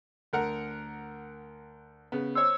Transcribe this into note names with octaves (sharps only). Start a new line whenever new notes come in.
D2 A#4 F#5
C#3 B3
C5 C#5 E6